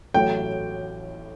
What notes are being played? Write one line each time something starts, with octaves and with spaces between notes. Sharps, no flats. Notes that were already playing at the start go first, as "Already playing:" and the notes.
A1 A2 F#3 G5